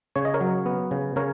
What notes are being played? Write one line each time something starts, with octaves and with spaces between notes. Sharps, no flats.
C#3 C#5
D#5
A#4 C#5
F#3
B3
C#3
C#3 A#4 C#5